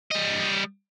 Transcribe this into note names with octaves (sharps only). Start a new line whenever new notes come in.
G3 D#5